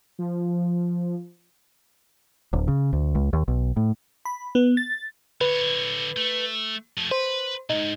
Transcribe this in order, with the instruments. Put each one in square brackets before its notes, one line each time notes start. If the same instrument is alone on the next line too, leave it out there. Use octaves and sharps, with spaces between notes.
[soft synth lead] F3
[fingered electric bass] D1
C#3
D2
C#2
D#2
B1
A2
[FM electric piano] B5
B3
A6
[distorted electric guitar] D3 C#5 [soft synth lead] B4
[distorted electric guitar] A3
F3 A3
[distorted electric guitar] B4 [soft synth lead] C5
[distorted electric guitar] B1 G#2 [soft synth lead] D#4